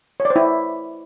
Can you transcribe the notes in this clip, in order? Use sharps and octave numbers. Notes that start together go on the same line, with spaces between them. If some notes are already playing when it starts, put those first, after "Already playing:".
C#5
D5
C5
E4